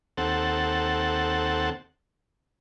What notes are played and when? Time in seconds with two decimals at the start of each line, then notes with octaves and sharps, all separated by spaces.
0.17 D#2 C4 A4 F#5